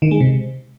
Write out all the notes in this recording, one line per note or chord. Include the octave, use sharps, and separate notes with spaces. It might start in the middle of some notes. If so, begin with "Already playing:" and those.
D#3
G#3
C3